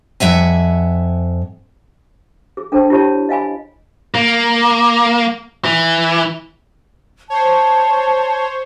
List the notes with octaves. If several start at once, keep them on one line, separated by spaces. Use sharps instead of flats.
F2 E5 F#5 G#5
G#4
D4 A4 C5 G5 A5
E4 G4 C#5 A5
D#5 F5 G#5 B5
A#3
E3
C5 C#5 A5